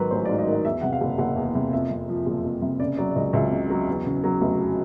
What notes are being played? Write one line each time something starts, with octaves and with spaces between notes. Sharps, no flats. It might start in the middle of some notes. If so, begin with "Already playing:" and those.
Already playing: G#2 D#3 F#3 A#4 B4
A1 C5
D5
G#2
D#5
D#3
D#5
E2 E5
C3 F#5
F5
F#1
F#1 F#5
E2
C3
F2 E5
C3
F3
F#1
F2
C3
C#3 D5
F#3 D5
D5
C#2 D#5
C#2 E5
C#3
F#3
E2
C#3
F#3
F1